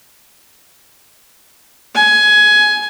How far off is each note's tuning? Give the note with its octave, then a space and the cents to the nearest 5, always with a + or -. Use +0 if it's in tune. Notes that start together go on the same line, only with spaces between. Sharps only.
G#5 +15